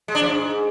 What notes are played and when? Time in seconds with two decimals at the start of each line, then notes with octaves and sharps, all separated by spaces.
0.08 G#3
0.15 D4
0.21 F3
0.28 G#2